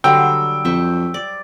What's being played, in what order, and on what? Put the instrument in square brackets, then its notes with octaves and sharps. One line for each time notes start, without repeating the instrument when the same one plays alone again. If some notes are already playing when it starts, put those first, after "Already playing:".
[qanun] D3 F#3 G3 [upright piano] G5 [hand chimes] E6
[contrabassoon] F2 [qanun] C5 E5 C#6
[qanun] D5